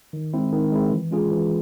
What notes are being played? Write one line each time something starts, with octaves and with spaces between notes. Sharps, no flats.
D#3
G#3 C4 E4
D#3
G#3 C4 E4
E3
G#3 C#4 F4 G#4
E3